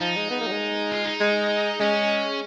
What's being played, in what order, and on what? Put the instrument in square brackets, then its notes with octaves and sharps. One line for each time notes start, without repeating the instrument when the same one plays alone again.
[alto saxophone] F3 [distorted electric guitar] D#4
[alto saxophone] G#3
B3
A#3
F#3
G#3
[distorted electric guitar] F4
D#4
[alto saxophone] G#3
[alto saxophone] G#3 [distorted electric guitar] C#4